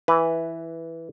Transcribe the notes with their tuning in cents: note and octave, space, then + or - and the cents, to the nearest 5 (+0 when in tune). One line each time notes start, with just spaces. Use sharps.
E3 +0 B4 +0